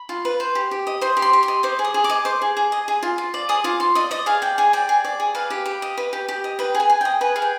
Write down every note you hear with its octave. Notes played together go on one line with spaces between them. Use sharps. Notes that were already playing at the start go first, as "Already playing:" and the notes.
Already playing: B5
F4
B4
C5
G4
G4
D#5
C5 C6
G4
C6
G4
C6
D#5
C5 D6
G#4
D#6
G#4
D6
D#5
C5 D6
G#4
G#4
D#5
G#4
F4
F4
D5
G#4 D#6
F4 D6
F4 C6
D5 D#5
D5 D#5
G#4 F5
D5 G5
G#4 G#5
D5 G5
G#4
D5
G#4
B4 F5
G4
G4
D#5
B4
G4
G4
D#5
B4 G5
G#4
G#5
G#4
D#5 G5
B4 G#5
G#4 F5
G5